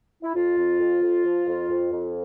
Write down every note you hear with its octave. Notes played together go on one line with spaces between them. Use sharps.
E4
F2 F4
F2
F2
F2
F3
F2
F2
F2